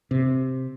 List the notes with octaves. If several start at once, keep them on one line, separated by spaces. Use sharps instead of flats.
C3